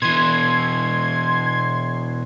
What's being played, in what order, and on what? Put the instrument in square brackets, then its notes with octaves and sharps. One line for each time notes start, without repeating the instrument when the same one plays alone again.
[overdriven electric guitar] B2 E3 [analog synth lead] C6 [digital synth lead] G#6